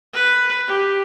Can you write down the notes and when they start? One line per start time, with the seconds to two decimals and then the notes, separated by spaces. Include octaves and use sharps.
0.13 B4
0.67 G4